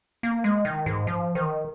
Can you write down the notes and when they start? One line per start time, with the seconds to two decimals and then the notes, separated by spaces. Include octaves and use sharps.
0.23 A#3
0.44 G#3
0.65 D#3
0.86 G#2
1.07 F3
1.35 D#3